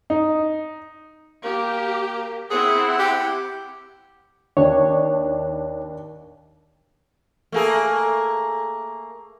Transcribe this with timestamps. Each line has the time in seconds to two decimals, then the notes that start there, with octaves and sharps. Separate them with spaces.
0.10 D#4
1.44 A#3 G4
2.51 C4 E4 G#4 F#5
2.99 G4
4.57 D#2 D4 C#5
7.52 A3 A#3 G#4